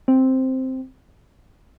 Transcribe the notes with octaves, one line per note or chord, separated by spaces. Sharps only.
C4